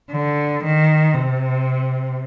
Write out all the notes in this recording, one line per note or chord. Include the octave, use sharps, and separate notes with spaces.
D3
D#3
C3